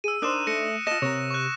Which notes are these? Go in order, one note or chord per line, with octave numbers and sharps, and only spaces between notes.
G#4 E6 D#7
D4 D#4 A#4 C5 D#6 F#6 E7
A3 A#6 C#7
F4 D#5 A5 A#6 E7
C3 A#4 C#5
C#6 F#6